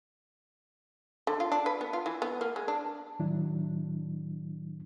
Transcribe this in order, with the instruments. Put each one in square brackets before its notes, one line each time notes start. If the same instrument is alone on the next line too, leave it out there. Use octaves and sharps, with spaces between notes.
[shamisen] D3
F4
D4
B4
B3
F4
E3
B3
A#3
G#3
D4
[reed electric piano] A2 D#3 F#3 D4 E4